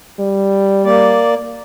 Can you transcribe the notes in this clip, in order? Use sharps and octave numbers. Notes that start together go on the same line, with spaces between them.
G3
A#3 D5